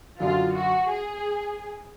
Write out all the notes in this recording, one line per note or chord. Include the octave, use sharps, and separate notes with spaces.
F#2 D3 F#3 F4
F#4
G#4